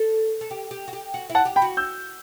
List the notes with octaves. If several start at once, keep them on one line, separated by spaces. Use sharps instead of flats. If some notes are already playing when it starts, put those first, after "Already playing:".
Already playing: A4
A4
G4
G4
F#4
G4
F#4
E4
F#5 A5
G4
G5 B5
F#4
E6 G6